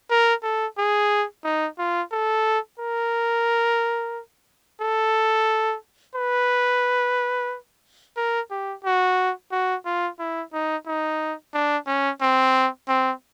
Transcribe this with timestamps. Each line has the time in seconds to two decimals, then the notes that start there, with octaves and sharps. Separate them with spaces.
0.10 A#4
0.43 A4
0.78 G#4
1.44 D#4
1.78 F4
2.12 A4
2.79 A#4
4.81 A4
6.15 B4
8.17 A#4
8.51 G4
8.85 F#4
9.52 F#4
9.85 F4
10.19 E4
10.53 D#4
10.87 D#4
11.54 D4
11.87 C#4
12.21 C4
12.88 C4